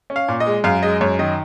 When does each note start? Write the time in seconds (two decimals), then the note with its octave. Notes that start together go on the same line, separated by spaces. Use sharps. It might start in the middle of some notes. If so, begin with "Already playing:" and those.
0.10 C#4
0.16 F5
0.28 A#2
0.40 D#5
0.46 G#3
0.64 F#2 F5
0.83 G#3 D#5
1.01 F#2 C#5
1.19 D#3 D#5